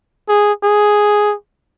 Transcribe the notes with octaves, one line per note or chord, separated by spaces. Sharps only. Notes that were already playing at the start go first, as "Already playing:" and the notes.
G#4
G#4